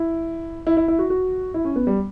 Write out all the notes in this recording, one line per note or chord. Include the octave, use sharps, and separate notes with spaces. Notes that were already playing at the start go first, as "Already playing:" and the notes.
Already playing: E4
E4
E4
E4
F#4
F#4
E4
C#4
B3
G3